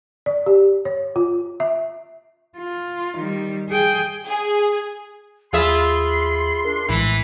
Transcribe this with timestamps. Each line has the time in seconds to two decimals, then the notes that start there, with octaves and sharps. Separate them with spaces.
0.26 D5
0.46 G4
0.85 C#5
1.16 F4
1.60 E5
2.58 F4
3.17 D#3 G3
3.69 G#4 G5
4.26 G#4
5.53 D#2 F4 G#4 E5 B5 C6
6.65 D4 A#4
6.89 A#1 A2 E3 G#3 E4 B5